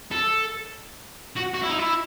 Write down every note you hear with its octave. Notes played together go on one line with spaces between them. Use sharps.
A4
F#4
F#4
E4
D#4
E4